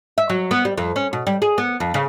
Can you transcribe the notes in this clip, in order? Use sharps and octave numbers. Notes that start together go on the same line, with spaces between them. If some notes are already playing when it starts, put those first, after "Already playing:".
E5
F#3
B3
G3
F2
C#4
B2
G3
G#4
B3
F2
C#3